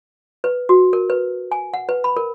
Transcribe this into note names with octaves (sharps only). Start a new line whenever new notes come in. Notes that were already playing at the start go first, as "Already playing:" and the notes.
B4
F#4
A#4
B4
G#5
F#5
B4
B5
A#4